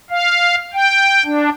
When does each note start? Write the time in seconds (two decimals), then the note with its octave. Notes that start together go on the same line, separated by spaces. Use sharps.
0.10 F5
0.74 G5
1.25 D4